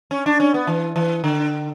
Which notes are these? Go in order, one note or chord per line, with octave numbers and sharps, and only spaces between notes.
C#4
D4
C#4
B3
E3
E3
D3